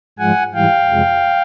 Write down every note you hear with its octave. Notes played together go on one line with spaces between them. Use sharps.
G#2 F3 G#3 F#5 G#5
G#2 E3 G3 F5 G5
F2 C3 F3 G#3